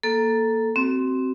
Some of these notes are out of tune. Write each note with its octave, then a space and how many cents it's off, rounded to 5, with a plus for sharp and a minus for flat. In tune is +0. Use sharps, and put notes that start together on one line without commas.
A#3 +0 A4 +0
C4 +0 F#4 +30